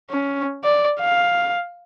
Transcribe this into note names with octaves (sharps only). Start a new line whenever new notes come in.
C#4
D5
F5